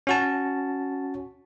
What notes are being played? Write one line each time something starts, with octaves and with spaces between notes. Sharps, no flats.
C#4 F#4 A5